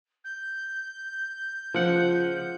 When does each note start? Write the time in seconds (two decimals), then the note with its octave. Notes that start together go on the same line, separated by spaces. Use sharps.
0.24 G6
1.74 C#2 F3 F#5